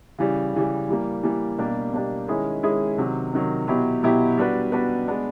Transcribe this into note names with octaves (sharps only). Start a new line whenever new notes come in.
C#3 E3 G3
C#3 E3 G3
E3 G3 A#3
E3 G3 A#3
B2 G3 A#3 D4 G4
B2 G3 A#3 D4 G4
D#3 G#3 C#4 E4 G#4
D#3 G#3 C#4 E4 G#4
C3 D#3 F#3
C3 D#3 F#3
B2 F#3 B3 E4 G4
B2 F#3 B3 E4 G4
G3 B3 D4 F#4 B4
G3 B3 D4 F#4 B4
G#3 B3 D4